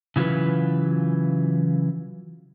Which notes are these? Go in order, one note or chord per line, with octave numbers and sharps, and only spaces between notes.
C#3 E3 F#3 F4 B4